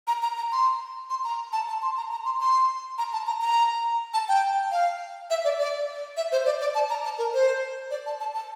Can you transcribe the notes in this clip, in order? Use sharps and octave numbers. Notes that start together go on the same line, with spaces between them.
A#5
A#5
A#5
C6
C6
A#5
A5
A5
C6
A#5
A#5
C6
C6
A#5
A5
A#5
A#5
A5
G5
F5
E5
D5
D5
E5
C5
D5
D5
A5
A#5
A5
A#4
C5
D5
A5
A5
A5